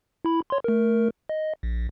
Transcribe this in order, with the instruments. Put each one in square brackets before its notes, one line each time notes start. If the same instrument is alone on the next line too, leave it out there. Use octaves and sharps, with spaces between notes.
[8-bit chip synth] E4 B5
C#5 C6
A3 A#4
D#5
A#1